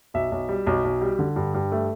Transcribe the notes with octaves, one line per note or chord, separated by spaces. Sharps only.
B1 E5
B1
G3
B1
B1
G3
D3
G2
G2
A3